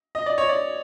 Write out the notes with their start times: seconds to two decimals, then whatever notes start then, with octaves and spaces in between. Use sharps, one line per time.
0.15 D#5
0.26 D5
0.38 C#5
0.49 D5